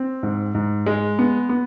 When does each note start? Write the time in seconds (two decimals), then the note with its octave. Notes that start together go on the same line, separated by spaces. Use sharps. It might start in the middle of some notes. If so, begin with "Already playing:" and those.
Already playing: C4
0.23 G#2
0.54 G#2
0.86 G#3
1.19 B3
1.49 B3